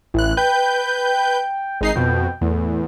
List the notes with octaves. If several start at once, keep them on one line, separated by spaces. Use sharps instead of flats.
A1 E4 F#6
B4 G5 G6
G#1 G#3 D#4 C7
F2 B2 G5
E2 A2